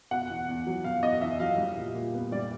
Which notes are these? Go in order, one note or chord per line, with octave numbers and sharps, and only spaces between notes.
B2 F#5
E2
E2
F#3
B2 F5
E2 D#5
E2 E5
F#3 F5
G3
A#2
A#2
B3
G3 D5